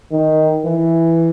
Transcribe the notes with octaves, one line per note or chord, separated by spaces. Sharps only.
D#3
E3